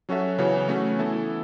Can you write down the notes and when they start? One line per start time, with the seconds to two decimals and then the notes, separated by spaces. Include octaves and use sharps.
0.09 F#3 C#4 F#4 A4 E5
0.38 C#3 E3 B3 F#4 C#5
0.68 A3 C#4 F#4
0.99 E3 B3 E4 A4